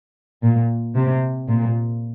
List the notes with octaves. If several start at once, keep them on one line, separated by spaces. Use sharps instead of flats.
A#2
C3
A#2